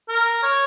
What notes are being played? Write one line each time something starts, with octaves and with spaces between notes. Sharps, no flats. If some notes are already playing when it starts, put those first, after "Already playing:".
A#4
C#5